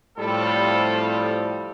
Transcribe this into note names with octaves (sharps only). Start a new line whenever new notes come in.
A2 F3 G3 C4 F4 A4